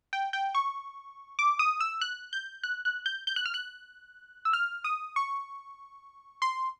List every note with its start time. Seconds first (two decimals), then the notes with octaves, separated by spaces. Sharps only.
0.13 G5
0.33 G5
0.55 C#6
1.39 D6
1.59 D#6
1.80 E6
2.01 F#6
2.33 G6
2.64 F#6
2.85 F#6
3.06 G6
3.27 G6
3.36 F#6
3.46 F6
3.54 F#6
4.45 E6
4.53 F6
4.84 D#6
5.16 C#6
6.42 C6